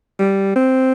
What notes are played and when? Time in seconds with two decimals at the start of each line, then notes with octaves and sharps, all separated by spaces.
0.19 G3
0.56 C4